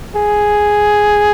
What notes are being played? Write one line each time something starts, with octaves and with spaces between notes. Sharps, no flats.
G#4